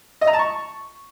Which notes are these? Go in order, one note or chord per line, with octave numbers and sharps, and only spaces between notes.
D#5
A#5
A5
C#6